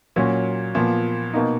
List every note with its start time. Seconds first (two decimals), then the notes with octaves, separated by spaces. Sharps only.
0.16 A#2 F#3 C#4
0.75 A#2 F3 B3
1.33 B2 A#3 D#4